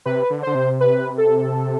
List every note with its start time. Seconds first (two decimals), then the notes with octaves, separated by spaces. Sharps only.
0.05 C3 B4
0.30 D3
0.43 D3 C5
0.55 C3
0.81 B4
1.18 A4